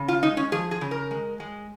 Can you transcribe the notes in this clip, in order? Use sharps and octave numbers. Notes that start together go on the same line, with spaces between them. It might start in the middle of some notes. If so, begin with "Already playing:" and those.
Already playing: C#3
F4
G#3 D#4
C#4
F3 G#4
G#4
C#3
A#4
G#3
G#3